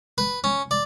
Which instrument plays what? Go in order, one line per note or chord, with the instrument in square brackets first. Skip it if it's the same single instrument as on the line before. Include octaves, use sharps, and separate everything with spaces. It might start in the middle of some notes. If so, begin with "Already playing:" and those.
[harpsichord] B4
C#4
D5